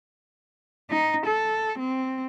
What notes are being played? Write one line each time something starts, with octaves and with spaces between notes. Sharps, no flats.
D#4
A4
C4